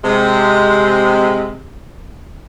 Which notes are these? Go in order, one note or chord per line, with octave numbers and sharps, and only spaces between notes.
C3 G#3